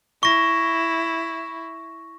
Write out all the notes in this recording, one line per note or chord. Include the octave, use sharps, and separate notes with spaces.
E4 C#6 A#6